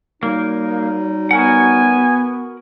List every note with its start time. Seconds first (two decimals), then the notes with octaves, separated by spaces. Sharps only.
0.23 F#3 G3 A#3 D#4
1.31 B3 F#4 A#4 F#5 G#5